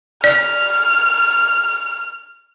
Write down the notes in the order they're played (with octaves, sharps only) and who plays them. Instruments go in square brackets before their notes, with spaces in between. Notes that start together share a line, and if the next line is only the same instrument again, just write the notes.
[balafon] D5 [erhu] F6